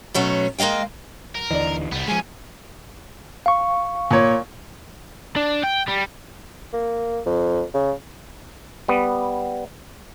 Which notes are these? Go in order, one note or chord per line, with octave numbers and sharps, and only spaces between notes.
B2 F#3 A3 C#4
G#3 A#3 D#5 F5 G5
F#3 A#4
D#2 D3 E3 D5 D#5
C2 G3 B3
F3 G#3 C#4 G#5
F5 C#6
A#2 C#5
D4
G5
G3
A#3
F2
C#3
G3 B3